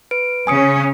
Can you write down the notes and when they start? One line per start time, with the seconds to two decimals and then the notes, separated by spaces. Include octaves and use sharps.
0.11 B4 D7
0.47 C#3 C#4 G#5 D#6 C#7